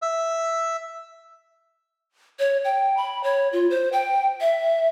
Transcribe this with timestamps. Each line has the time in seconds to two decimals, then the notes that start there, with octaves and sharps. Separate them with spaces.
0.02 E5
2.39 C#5
2.64 G5
2.97 B5
3.24 C#5
3.53 F4
3.70 C5
3.92 G5
4.41 E5